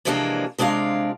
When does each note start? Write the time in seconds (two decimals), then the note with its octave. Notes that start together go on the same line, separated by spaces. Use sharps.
0.05 C3 E3 F3 G#3 A#3 D4
0.58 C3 G#3 D4 F4 F5